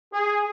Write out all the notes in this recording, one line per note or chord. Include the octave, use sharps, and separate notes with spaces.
G#4